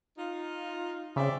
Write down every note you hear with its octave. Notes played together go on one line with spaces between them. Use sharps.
D#4 F4
C#3 C4 D5 E5